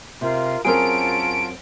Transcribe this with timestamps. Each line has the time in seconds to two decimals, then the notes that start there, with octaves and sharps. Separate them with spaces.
0.21 C3 F4 A#4 F5
0.65 F#2 C4 C#4 F4 G#4 A#4 A5 D7